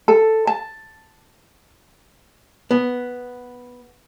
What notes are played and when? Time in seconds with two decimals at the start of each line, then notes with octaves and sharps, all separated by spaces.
0.08 A4
0.47 A5
2.71 B3